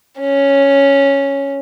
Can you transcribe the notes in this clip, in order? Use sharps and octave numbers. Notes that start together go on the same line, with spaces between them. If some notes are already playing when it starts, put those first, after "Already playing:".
C#4